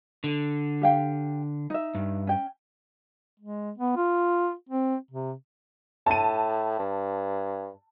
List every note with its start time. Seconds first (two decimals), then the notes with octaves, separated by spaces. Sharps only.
0.24 D3
0.82 G4 F5 G5
1.70 D#4 E5
1.95 G2
2.27 C#4 G5
3.40 G#3
3.78 B3
3.96 F4
4.69 C4
5.11 C3
6.06 A2 A5 D#7
6.79 G2